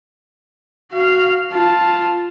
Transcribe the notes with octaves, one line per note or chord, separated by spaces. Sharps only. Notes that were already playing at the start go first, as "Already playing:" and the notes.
F#4 F5
F4 A5